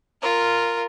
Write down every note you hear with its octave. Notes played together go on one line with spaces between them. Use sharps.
F4 A#4